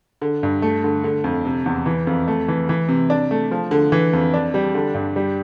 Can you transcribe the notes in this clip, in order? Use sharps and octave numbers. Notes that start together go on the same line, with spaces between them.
D3
G2
A3
D3
D3
F2
C3
E2
E3
F2
A3
E3
E3
C3
D4
A3
F3
D3
E3
F2
D4
G3
D3
G2
G3